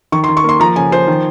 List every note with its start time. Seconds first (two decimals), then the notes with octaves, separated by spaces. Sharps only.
0.12 D#3 C#6
0.24 C6
0.28 D#3
0.37 C#6
0.44 A#3 C6
0.60 F3 A#5
0.76 C#3 G#5
0.92 F3 C5
1.08 D#3